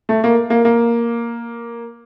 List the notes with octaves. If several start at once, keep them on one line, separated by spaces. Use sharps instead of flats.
A3
A#3
A#3
A#3